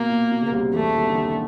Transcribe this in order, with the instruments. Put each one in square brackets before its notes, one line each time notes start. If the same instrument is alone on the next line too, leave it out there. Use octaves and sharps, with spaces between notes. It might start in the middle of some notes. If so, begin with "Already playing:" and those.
Already playing: [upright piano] B2 [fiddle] A#3
[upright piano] A#2
B2
C#3
C2 C3
[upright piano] E2 E3 [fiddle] A3
[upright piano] D#2 D#3
D3
D#2 D#3